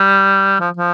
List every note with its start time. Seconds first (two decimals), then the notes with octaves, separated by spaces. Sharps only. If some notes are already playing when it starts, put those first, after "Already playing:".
Already playing: G3
0.60 F3
0.77 F3